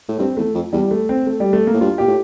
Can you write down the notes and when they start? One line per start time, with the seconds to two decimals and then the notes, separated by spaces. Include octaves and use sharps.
0.08 A2
0.19 G2 C4
0.37 E2 A3
0.55 F2
0.73 E2 G3
0.91 A3
1.09 C4
1.27 A3
1.40 G3
1.53 A3
1.67 A#3
1.74 A2
1.81 G2 F4
1.98 A#2 G4
2.07 A2